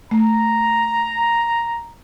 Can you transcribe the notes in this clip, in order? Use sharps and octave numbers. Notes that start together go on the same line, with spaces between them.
A3 A#5